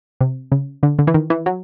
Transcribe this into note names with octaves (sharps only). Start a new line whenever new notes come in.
C3
C#3
D3
D3
E3
D#3
E3
F#3